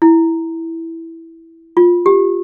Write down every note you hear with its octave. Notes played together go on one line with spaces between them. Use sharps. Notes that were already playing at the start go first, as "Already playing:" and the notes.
E4
F4
G4